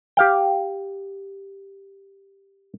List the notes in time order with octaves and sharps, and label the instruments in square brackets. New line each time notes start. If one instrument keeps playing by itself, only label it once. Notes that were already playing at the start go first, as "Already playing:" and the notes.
[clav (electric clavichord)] G4 F5 G5